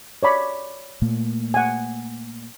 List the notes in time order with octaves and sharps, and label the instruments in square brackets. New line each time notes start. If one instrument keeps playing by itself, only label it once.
[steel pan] C#5 D5 B5
[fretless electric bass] A#2 A3 A#3
[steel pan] F#5 G#5